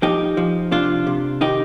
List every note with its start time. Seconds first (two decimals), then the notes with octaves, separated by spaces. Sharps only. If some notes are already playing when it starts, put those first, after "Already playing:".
0.02 F3 D#4 G4
0.37 F3
0.71 C3 D4 F4
1.07 C3
1.41 D#3 D#4 G4